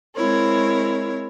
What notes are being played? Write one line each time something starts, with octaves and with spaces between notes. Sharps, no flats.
G#3 C4 E4 A#4 C#5